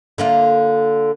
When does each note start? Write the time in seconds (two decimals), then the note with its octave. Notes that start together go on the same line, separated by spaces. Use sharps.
0.18 D3 A#3 F4